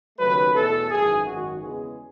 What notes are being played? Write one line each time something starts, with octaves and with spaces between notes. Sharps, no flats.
D#2 C#3 F#3 A3 B4
E2 B2 A3 A4
G#1 F#2 E3 G#4
G#1 F#2 D#3 F#4
E2 C#3 G#3 B3 G#4